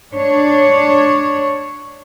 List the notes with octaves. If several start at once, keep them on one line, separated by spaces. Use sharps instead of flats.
D4 C#5